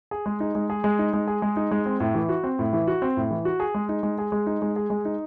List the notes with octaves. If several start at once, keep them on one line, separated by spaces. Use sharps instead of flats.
G#4
G#3
D#4
G#3
G#4
G#3
D#4
G#3
G#4
G#3
D#4
G#3
C4
A2
E3
F#4
C4
A2
E3
F#4
C4
A2
E3
F#4
G#4
G#3
D#4
G#3
G#4
G#3
D#4
G#3
G#4
G#3
D#4